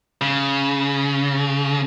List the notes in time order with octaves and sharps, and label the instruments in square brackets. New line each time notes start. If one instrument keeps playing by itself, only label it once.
[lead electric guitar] C#3